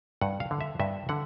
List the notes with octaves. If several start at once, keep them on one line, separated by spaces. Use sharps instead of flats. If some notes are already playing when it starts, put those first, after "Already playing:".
G2 F#5
F5
D3
E5
G2 E5
D3 F#5